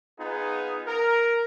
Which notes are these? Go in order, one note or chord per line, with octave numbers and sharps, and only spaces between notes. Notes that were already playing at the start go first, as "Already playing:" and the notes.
B3 D#4 F4 G#4
A#4